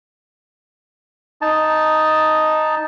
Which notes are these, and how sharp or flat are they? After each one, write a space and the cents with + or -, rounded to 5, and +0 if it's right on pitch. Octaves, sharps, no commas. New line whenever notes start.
D#4 +0 A5 +0